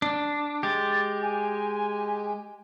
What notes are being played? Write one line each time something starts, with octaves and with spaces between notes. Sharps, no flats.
D4
G#3 G4 A6
G#5